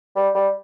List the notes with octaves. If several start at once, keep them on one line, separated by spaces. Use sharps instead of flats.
G3
G3